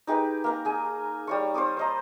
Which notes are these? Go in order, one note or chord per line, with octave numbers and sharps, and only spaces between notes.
D#4 G4 G#4 B4
A#3 F5 A#5
G#4 G#5
G3 C#5 C#6
C5 C#5 D6 D#6
C5 D#5 A#5